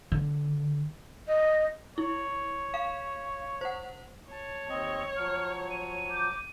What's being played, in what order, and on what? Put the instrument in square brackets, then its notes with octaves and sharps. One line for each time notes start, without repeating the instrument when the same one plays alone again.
[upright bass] D3
[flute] D#5
[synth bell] E4 [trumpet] C#5
[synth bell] F5
C5 F#5
[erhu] C#5 [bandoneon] A5
[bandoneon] D#2 C4 D#5
[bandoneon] F3 F#3 [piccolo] F6
[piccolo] D#7
[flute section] D6 G6